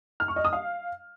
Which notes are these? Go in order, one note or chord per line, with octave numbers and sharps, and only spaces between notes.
F6
C#6
D#5
D#6
F5